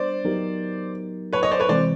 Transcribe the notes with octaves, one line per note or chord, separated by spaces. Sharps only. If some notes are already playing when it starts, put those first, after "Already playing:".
Already playing: G3 B3 D4 C5 D5
F#3 B3 D#4 G4 A#4
B4 C#5
C#5 D#5
C5 D5
B4 C#5
C3 E3 G#3 C4 C5 D5